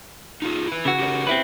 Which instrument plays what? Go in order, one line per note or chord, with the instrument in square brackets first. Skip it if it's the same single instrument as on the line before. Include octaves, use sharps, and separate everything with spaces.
[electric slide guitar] D#4 F4 G#4
E4 B4
[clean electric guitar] C#3 F#4
[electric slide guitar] G4 A#4 C#5
[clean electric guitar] C4 E4 B4